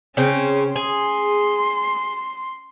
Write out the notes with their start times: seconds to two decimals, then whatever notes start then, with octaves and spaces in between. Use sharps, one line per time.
0.17 C#3 C4 C#4
0.76 G#4 C6